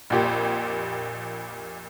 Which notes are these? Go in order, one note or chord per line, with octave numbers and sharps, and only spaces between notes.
A#1 F2 A#2 G4